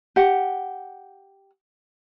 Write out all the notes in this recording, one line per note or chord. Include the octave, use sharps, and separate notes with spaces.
G4 F#5